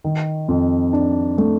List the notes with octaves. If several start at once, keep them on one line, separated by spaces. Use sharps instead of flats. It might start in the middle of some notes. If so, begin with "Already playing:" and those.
D#3
F2
D4
A3